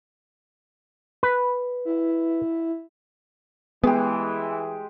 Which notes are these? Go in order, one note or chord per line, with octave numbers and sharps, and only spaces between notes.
B4
E4
E3 G#3 B3 G4